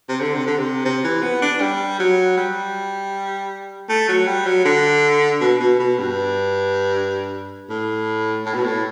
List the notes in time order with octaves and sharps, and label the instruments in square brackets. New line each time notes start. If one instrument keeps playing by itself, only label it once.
[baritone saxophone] C3
D3
C3
D3
C3
C3
E3
B3
D4
G3
F#3
G3
A3
F#3
G3
F#3
D3
B2
B2
B2
G2
A2
A2
B2
A2